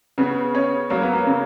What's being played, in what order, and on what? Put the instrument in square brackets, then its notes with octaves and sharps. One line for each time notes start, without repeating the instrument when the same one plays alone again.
[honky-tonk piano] C#3 [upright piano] B3
[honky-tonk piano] C#4
[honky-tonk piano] F#3 [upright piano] A#3
[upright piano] B3
A#3
[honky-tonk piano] C#3